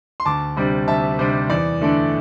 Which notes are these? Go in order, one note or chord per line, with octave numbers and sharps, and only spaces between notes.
C6
D2 A5 D6
C3 G3 D4
D2 E5 A5
C3 G3 D4 C5
E2 D5
D3 A3 D4